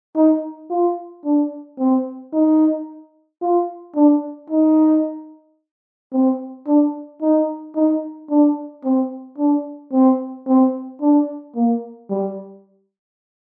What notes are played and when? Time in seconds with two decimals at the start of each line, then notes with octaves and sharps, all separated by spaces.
0.16 D#4
0.70 F4
1.25 D4
1.78 C4
2.33 D#4
3.42 F4
3.96 D4
4.50 D#4
6.12 C4
6.67 D4
7.22 D#4
7.76 D#4
8.30 D4
8.84 C4
9.38 D4
9.93 C4
10.47 C4
11.01 D4
11.55 A#3
12.10 G3